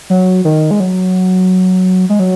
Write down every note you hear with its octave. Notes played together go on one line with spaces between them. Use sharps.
F#3
D#3
G#3
F#3
G#3
F#3